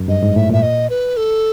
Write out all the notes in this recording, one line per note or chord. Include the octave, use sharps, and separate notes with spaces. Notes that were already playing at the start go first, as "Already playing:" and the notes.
Already playing: F#2
G2 D#5
G#2
A2 E5
A#2 E5
D#5
B4
A4